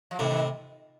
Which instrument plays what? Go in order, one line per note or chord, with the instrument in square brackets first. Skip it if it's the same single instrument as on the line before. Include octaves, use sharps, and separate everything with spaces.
[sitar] F3
[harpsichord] A2 C3 [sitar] D#3
[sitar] D#3